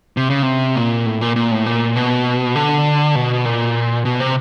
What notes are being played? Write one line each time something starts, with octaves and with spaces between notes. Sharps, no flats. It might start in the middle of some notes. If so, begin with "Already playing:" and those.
C3
C#3
C3
A#2
A2
A#2
A#2
A2
A#2
B2
D3
B2
A#2
B2
C3